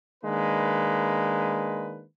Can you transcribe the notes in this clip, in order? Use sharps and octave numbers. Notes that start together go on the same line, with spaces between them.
D#3 G#3 A#3 D4 B4